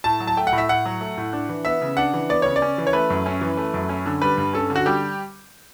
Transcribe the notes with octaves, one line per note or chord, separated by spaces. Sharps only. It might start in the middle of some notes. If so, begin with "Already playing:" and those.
A2 A5
F#3
A5
A3 G5
F#5
A2
E5
A2 F#5
F#3
A3
A2
D4
E3
B3 E5
C#3
D4 F#5
E3
B3 D5
C#3 C#5
D5
C#4
E3
C#5
A3 B4
F#2
C#4
E3
A3
F#2
C#4
D3
G3 B4
G2
C#4 A4
D3
F#4
G3 G4